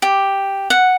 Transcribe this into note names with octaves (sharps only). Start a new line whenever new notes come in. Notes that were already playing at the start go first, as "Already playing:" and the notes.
G4
F#5